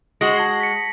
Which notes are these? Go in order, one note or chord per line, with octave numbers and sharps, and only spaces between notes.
G#3 F#4 A#6 F#7
A5 G#6 C7
B6 C#7